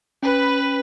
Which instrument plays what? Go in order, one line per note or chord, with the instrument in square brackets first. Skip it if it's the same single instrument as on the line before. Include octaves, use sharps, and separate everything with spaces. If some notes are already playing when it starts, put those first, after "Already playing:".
[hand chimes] C#4 [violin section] B4